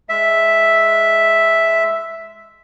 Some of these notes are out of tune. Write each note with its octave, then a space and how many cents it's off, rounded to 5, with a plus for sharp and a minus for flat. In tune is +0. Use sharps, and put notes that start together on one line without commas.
G#3 +0 E5 +0